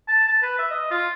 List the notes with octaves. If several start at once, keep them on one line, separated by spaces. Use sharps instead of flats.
A5
A5
B4
E5
D#5
F4